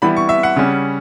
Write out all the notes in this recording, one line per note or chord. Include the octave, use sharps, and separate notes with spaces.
E3 G3 B3 E4 B5
C#6
E5
F#5
C#3 G3 C#4